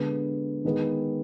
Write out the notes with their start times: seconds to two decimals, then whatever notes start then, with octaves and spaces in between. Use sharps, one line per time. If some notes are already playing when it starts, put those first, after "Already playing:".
Already playing: D3 G#3 B3
0.65 D#3 G#3 B3